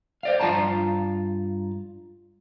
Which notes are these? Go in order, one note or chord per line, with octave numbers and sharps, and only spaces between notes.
C5 D5 F5
G2 F4 F5 A5 A#5